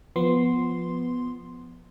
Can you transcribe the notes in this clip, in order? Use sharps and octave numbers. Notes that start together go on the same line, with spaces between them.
F3 B3 C6